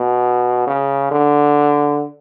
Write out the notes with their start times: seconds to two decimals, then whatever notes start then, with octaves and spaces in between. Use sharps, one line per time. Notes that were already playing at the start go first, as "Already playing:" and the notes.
Already playing: B2
0.67 C#3
1.12 D3